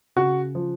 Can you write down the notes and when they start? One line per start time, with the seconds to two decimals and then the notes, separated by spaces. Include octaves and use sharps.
0.16 C#3 F#4
0.55 F3